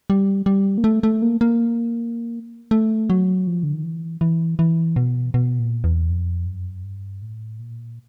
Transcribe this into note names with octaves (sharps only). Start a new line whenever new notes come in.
G3
G3
A#3
A3
A3
A#3
A#3
A3
F#3
F3
D3
D#3
E3
E3
E3
B2
B2
A#2
E2
F2
F#2
G2
A2
A#2